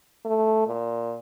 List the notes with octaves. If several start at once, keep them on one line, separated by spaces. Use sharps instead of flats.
A3
A#2